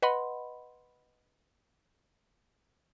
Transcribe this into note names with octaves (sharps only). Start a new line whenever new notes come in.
B4 D#5 F#5 B5 C6